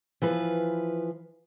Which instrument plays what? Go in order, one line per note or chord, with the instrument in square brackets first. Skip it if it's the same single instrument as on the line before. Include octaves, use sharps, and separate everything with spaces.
[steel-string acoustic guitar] E3 F3 B4